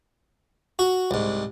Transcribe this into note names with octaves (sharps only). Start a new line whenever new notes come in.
F#4
C2 G#2